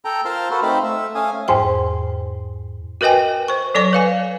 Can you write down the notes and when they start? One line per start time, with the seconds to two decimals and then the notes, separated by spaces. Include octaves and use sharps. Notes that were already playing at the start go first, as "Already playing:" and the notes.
0.05 A4 G5 A#5
0.25 F4 A#4 C5 A5 C6 F6
0.51 F#4 A4 B4 C5
0.62 A3 C4 D#4 C5 F5 B5
0.84 A3 E5
1.15 A3 C#4 F5 G#5 D#6
1.48 E2 G#2 C5 G5
3.01 F#4 A#4 B4 D#5 G5 G#5
3.48 C5 C#6
3.75 F#3 A4 C#5 D5 C#6
3.93 B4 F5 G#5